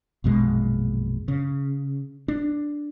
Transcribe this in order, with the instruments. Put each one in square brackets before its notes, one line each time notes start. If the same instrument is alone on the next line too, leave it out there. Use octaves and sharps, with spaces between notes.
[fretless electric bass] A#1 F#2 B2 G#3
C#3
D4